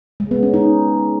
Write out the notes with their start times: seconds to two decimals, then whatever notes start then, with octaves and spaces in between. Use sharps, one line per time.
0.20 G#3
0.31 B3
0.43 C#4
0.54 D#4